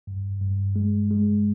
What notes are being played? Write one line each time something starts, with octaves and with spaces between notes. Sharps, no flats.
G2
G2
G#3
G#3